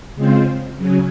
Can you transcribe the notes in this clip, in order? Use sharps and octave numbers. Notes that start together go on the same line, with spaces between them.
C#3 G#3 C4 F4 C5
C#3 F#3 C#4